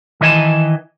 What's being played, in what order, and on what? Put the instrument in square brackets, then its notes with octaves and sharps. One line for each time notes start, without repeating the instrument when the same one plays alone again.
[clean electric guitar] D#3 E3 D#5 G#5 A5